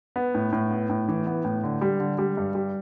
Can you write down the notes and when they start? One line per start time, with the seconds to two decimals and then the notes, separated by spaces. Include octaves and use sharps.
0.16 B3
0.35 A2
0.53 A2
0.71 B3
0.90 A2
1.08 E3
1.26 B3
1.45 A2
1.63 D3
1.81 G3
1.99 D3
2.18 G3
2.37 G2
2.55 G3